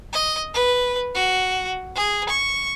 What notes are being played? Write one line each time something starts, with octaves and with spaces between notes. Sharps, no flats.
D#5
B4
F#4
G#4
C#6